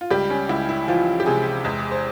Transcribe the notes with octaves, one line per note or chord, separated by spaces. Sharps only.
F4
C#2 G3 G4
C#4
C#2 E4
E4
E3 F3 F4
G4
C3 G#3 G#4
E2 G#3 G#4
C5